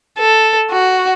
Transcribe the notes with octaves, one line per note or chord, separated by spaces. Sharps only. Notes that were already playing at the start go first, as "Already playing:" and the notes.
A4
F#4